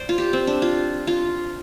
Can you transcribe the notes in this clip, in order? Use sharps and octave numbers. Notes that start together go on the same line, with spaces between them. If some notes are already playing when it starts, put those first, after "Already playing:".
Already playing: C5 D5
F4
G4
C4
D4
F4
F4